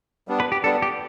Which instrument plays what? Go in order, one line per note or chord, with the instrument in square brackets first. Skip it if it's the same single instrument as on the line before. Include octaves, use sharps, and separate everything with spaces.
[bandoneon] G3 B3 D4
[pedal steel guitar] B4
G4
[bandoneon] G3 B3 D4 [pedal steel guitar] A4
[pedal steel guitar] G4